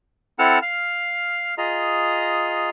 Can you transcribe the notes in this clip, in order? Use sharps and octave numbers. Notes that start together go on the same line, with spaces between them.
C4 E4 A4 F#5 A5 F6
F5 F6
F4 G#4 D#5 A#5